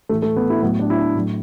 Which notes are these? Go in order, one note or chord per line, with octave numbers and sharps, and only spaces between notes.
A2 E3 A3
A3
B3
E4
A2 F#3 B3
D4
E4
D4
A2 F#3